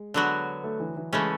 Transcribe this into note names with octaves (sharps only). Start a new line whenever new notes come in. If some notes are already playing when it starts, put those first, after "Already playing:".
Already playing: G#3
D3 F#3 B3 F#4
A3
E3
E3
C#3 E3 G#3 A3 C#4